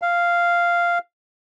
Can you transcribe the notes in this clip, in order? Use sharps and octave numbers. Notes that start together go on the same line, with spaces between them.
F5